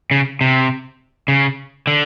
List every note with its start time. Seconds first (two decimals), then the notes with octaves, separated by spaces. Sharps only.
0.11 C#3
0.41 C3
1.28 C#3
1.87 D3